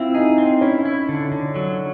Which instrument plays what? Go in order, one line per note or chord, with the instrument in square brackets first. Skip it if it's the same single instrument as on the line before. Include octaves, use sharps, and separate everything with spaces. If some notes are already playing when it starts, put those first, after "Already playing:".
Already playing: [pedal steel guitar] C4 [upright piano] E4 F4
[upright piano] D#4 [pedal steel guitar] G#4
[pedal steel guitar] C4
[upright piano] C#4 [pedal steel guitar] E4
[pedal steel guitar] E4
D3
D3
F#3